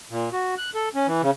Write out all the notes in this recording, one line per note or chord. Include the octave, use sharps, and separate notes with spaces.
A#2
F#4
F#6
A4
C#4
E3
C#3